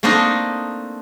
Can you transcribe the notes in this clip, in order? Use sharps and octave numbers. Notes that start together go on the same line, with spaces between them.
A3 A#3 C4 D4 D#4 D#5